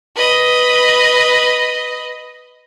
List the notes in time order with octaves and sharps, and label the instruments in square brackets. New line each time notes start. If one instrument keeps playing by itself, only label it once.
[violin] B4 D#5